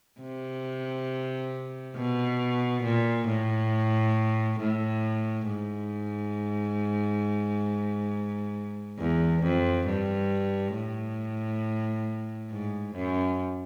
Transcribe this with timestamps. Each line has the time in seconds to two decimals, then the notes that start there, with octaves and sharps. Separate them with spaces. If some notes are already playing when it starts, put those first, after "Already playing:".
0.20 C3
1.96 B2
2.84 A#2
3.28 A2
4.59 A2
5.48 G#2
8.98 E2
9.43 F2
9.87 G2
10.75 A2
12.51 G#2
12.95 F#2